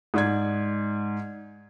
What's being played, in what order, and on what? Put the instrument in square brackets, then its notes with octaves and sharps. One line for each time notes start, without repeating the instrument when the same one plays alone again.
[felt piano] G#2 D5 G#6